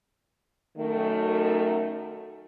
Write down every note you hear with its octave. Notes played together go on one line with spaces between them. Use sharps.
F#2 D#3 A3